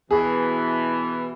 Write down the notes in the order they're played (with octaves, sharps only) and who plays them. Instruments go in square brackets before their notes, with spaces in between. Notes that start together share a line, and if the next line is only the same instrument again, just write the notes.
[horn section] B2 E3 [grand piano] G#4